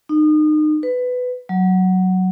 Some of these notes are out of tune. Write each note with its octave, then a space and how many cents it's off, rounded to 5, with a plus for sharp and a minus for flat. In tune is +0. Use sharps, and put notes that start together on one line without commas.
D#4 -30
B4 +15
F#3 +5